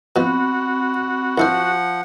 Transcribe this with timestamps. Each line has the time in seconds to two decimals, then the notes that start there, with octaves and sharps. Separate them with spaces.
0.16 B2 F3 C4 F#4 B5
1.38 C2 F3 E4 C5 F#5